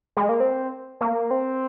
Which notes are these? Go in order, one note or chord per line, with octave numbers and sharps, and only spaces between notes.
G#3
A#3
C4
A#3
C4